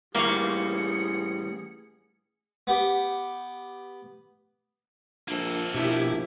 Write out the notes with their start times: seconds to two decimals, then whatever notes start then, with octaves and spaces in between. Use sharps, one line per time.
0.15 A2 E3 G3 A#3 G#4 F5 C#6 C#7
2.67 B3 G4
5.28 A#1 A#3 A4
5.74 A#1 B2 E4 G4 G#6